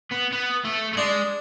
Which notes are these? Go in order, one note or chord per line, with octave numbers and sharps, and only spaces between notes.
B3
B3
A3
A3
G#3 D4